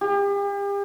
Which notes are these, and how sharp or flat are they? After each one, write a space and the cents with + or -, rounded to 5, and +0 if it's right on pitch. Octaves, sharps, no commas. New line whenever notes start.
G4 +40